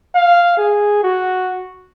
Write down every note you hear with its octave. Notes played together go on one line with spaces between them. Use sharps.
F5
G#4
F#4